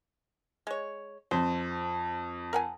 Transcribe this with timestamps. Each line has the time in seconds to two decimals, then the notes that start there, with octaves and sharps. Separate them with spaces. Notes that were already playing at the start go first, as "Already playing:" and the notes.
0.67 G#3 C#5
1.31 F2 C5
2.53 A#4 F#5 G#5